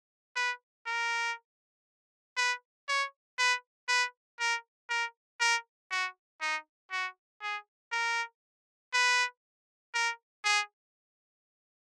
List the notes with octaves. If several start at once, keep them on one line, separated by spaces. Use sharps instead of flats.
B4
A#4
B4
C#5
B4
B4
A#4
A#4
A#4
F#4
D#4
F#4
G#4
A#4
B4
A#4
G#4